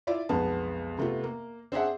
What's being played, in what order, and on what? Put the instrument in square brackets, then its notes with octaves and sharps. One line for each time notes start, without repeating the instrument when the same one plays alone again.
[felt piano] E4 F4 D5 E5
B1 F2 G#3 B3 A5
C3 A3 B3 F4
A#3
C4 D4 G#4 E5 F#5